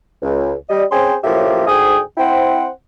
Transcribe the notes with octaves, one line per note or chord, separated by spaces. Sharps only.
C#2
G3 D#5
C4 C#4 G#4 C5 G5 C6
F#2 A2 F3 A#3 G4 E5
D2 G#2 G#4 G5 D#6
C4 E4 C5 F#5 G5